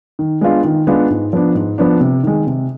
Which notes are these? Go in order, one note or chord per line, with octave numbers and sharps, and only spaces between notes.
D#3
G#3 B3 D4 F4
D#3
G#3 B3 D4 F4
G#2
F3 B3 D4
G#2
F3 B3 D4
C3
D#3 G#3
C3